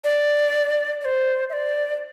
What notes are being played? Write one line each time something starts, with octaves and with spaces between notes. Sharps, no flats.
D5
D5
C5
E5
D5